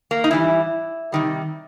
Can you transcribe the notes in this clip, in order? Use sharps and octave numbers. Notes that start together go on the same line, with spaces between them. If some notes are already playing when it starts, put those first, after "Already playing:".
A#3
D#4
G#2 E3 G3 E4
C3 D#3 G3